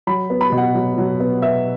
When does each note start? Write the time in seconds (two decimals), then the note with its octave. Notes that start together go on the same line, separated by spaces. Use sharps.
0.07 F#3 B5
0.30 B3
0.41 B5
0.52 B2
0.58 F#5
0.75 F#3
0.98 F#3
1.20 B3
1.42 B3 E5